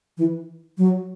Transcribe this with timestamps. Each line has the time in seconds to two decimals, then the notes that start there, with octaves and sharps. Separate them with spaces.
0.17 E3
0.78 F#3